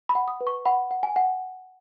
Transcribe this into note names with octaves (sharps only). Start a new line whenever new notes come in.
B5
F#5
D#6
B4
C#6
F#5 B5
F#5
G#5
F#5